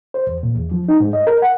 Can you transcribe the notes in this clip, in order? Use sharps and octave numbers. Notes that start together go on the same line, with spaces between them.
C5
E2
A#2
E2
F3
D#4
G#2
D#5
A#4
F#5